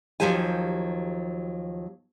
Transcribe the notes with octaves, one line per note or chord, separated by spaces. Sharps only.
D#2 A2 F3 F#3 G4 G#5